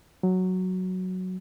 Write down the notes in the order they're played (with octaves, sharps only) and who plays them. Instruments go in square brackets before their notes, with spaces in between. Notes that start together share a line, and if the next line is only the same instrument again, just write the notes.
[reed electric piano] F#3